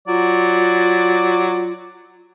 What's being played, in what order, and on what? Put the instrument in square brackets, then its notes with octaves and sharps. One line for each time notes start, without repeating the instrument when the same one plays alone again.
[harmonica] F#3 D5 [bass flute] F4